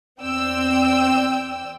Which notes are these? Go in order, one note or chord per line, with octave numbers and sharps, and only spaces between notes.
E2 C4 D5 G5 E6